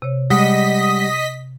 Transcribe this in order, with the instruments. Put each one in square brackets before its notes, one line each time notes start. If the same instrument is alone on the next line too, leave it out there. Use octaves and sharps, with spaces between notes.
[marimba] C3 C#5
[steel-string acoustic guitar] G3 G#3 F#5 [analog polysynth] D#5 B6